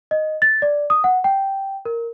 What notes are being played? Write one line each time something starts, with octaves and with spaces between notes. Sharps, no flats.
D#5
A6
D5
D#6
F#5
G5
A#4